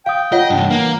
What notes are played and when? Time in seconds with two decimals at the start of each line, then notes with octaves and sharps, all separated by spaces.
0.06 F5 G5 D#6
0.32 F4 C#5 D#5 F#5
0.50 C2 G2 D4
0.70 E3 A#3